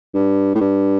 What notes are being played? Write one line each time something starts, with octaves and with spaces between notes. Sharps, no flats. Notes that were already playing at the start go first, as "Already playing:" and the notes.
G2
A2
G2